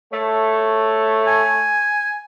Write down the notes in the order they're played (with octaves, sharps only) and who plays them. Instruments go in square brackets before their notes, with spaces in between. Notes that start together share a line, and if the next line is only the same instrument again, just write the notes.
[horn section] A3 C#5
[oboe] G#5